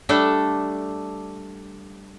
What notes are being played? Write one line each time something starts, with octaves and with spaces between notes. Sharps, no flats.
G3 A3 D4 A4